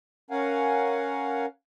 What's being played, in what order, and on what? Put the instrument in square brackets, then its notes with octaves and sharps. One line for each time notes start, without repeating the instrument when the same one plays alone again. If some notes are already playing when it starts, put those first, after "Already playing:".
[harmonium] C#4 A#4 F5 F#5 G#5